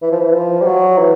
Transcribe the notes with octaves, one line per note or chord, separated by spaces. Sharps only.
E3
F3
E3
F3
G3
F#3
E3